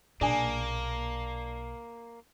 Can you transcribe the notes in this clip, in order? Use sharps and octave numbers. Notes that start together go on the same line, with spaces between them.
B1 A#2 A#3 D4 G#4 G#5